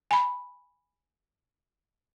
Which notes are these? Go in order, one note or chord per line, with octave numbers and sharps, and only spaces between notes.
G#5 B5